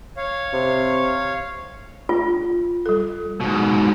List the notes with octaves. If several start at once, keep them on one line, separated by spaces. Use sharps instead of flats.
C#5 F5
C3
F4
G3 A4
G#2 B2